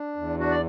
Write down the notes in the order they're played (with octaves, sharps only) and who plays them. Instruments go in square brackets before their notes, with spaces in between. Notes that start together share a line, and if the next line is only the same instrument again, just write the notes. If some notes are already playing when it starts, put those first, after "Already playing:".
Already playing: [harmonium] D4
E2
D4 F#4
D5